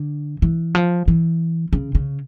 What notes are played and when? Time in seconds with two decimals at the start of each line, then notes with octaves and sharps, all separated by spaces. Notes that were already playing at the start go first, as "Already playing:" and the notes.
Already playing: D3
0.42 E3
0.75 F3
1.08 E3
1.73 C#3
1.95 C#3